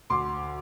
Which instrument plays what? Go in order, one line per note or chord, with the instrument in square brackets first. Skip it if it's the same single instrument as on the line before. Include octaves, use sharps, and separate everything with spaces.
[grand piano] D2 C6 D6